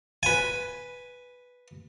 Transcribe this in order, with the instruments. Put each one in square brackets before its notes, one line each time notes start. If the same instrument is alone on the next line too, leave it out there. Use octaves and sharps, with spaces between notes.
[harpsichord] B4 G#5